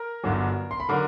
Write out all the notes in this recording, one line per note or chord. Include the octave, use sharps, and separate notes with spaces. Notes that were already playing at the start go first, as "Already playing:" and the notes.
Already playing: A#4 A#5
G1 G2 D3 F#3
C6
B5
D3 F#3 A#4 A#5